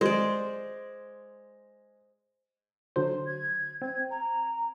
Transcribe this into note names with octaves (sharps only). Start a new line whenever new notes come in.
G#3 C5 D5
D3 F#3 C5
G#6
C4 G#6
A#5